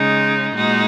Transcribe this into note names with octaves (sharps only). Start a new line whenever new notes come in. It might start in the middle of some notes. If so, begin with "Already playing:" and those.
Already playing: C#3 G#3 D#4
A#2 G#3 D#4 F#4